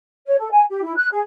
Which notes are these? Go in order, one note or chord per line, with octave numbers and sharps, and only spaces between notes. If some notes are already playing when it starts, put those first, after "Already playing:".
C#5
A4
G#5
G4
E4
F#6
G#4